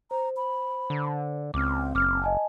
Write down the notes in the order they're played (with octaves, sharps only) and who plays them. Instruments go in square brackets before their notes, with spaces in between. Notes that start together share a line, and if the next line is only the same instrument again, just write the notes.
[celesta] C5 [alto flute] A#5
[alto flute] B5
[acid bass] D3
[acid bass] C#2 [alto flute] C4 [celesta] D6 F6
[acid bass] F#1 [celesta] D6 F6
[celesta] D#5 G#5 A5